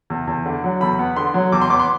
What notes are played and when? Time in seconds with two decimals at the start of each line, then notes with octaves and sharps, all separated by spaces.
0.10 E2
0.27 E2
0.46 D3
0.64 F#3
0.81 E2 B5
0.99 B3
1.16 D3 C6
1.34 F#3
1.52 E2 D6
1.61 C6
1.70 B3 D6
1.79 C6